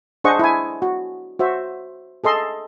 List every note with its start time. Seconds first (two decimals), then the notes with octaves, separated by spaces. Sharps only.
0.24 D4 G#4 C5 D#5 F#5 C#6
0.39 E4 G#5
0.82 F#4
1.39 F#4 C5 E5
2.24 G#4 A4 D#5 C6